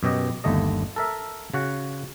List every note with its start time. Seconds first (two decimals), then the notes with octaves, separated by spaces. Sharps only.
0.03 F#2 B2 G4 D#5
0.44 G1 D#2 A3 D#5
0.96 A4 A#4 E5
1.54 C#3 F#4 F#5